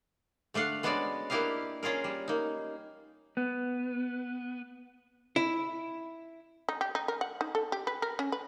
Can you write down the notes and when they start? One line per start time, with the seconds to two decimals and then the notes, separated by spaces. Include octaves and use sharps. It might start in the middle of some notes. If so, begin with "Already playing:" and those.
0.54 D3 A3 D4 F5 F#5
0.83 G#3 B3 C#4 D4 F#4 D5
1.30 A#3 D4 E4 G4 D#5 F5
1.83 C#4 F4 G#4 A#4
2.04 G3
2.28 A#3 D#4
3.37 B3
5.36 E4
6.69 D#4
6.81 G4
6.95 D#4
7.08 A#4
7.21 F#5
7.41 D#4
7.55 A4
7.72 G4
7.87 B4
8.02 A#4
8.19 C#4
8.32 B4